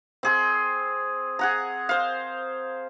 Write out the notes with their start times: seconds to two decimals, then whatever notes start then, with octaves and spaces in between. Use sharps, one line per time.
0.23 C4 G#4 C6
1.39 G#4 F#5 A#5
1.89 C5 F5